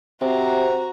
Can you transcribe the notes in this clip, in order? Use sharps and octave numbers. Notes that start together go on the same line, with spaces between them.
C3 F#4 C5 A#5